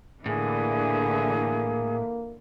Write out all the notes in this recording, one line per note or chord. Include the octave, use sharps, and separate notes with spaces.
A2 D3 E3 A#3 G#4